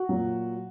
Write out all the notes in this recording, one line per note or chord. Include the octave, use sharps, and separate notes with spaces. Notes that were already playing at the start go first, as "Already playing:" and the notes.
Already playing: F#4
A#2 F#3